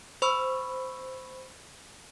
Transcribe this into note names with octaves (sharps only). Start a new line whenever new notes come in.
C5 B5 C#6 E6